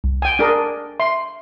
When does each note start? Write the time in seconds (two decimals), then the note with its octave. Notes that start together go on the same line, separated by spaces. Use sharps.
0.04 C2
0.22 G5 G#5
0.39 D4 G#4 A#4
1.00 E5 C6